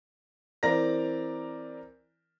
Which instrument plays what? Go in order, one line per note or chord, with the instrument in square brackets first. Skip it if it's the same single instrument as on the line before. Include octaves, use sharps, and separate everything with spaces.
[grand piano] E3 C4 A#4 D5 A#5 A#6